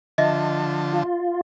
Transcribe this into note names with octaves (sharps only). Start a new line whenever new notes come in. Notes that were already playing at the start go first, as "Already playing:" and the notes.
D3 F3 D#5 E5 A5
F4